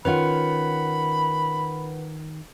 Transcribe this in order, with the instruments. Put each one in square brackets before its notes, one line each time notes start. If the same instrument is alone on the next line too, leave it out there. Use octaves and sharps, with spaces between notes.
[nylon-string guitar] D#3 C#4 F4 [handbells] B4 F#5 [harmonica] B5